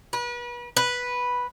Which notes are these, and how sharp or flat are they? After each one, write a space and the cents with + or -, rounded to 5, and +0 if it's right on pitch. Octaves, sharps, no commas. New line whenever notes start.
B4 -35
B4 -5